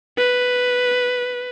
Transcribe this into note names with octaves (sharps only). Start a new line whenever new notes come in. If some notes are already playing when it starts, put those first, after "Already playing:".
B4